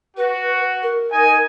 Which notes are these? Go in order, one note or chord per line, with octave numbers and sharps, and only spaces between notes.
F#4 B4
A#4
D#4 D#5 G#5